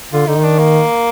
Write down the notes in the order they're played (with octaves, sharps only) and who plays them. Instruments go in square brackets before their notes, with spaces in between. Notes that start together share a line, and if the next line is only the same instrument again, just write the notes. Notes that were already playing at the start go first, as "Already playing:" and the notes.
[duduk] D3 [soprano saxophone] F4
[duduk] D3 [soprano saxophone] D#4
[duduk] D#3
[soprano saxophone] D4
A#3